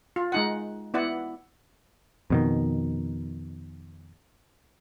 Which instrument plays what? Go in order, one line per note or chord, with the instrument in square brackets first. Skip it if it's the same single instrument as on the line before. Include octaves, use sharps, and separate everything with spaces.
[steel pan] F4
G#3 D#4 F#5
B3 E4 D5 F#5
[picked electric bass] F2 B2 D#3